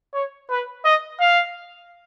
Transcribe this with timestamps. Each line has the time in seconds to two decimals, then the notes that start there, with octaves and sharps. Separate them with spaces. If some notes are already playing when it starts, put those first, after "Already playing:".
0.14 C#5
0.50 B4
0.85 D#5
1.20 F5